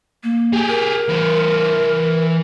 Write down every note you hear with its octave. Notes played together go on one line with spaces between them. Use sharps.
A#3
G4 G#4
A#4
E3 C5